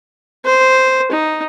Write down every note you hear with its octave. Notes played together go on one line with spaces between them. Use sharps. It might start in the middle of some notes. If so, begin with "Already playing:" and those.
C5
D#4